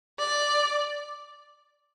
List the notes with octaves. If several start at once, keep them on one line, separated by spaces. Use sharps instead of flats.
D5